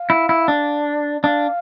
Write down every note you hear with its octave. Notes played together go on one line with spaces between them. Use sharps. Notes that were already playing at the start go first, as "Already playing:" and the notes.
Already playing: F5
E4
E4
D4
D4 F5